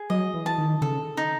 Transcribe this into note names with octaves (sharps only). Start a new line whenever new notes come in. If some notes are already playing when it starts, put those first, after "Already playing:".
Already playing: G#4
F#3 D#5
E3
A5
D#3
C#3 A4
D#4